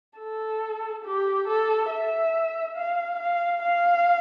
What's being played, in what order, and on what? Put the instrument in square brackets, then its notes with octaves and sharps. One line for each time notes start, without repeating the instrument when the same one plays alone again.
[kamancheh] A4
G4
A4
E5
F5
F5
F5